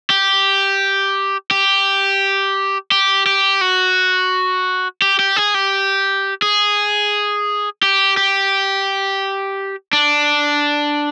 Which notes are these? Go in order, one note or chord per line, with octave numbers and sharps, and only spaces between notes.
G4
G4
G4
G4
F#4
G4
G4
G#4
G4
G#4
G4
G4
D4